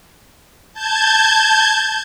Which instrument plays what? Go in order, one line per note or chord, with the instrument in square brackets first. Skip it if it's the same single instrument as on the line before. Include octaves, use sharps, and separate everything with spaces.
[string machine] A5 G6 G#6